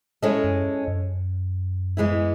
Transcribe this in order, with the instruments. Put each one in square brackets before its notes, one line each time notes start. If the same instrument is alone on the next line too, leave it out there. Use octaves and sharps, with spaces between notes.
[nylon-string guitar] G#3 C#4 E4 A4 D#5
[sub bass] F#2
F#2
[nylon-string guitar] E3 G#3 B3 E4